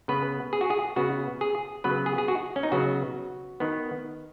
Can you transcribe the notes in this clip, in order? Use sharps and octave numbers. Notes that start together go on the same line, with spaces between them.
C#3 B3 B4
G#4
F#4
G#4
C#3 B3 F#4
G#4
C#3 F#3 B3 B4
G#4
G#4
F#4
C#4
D#4
C#3 F#3 B3 F#4
D#3 B3